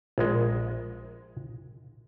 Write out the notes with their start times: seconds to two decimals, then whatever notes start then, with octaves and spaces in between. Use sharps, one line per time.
0.18 A#1 G#3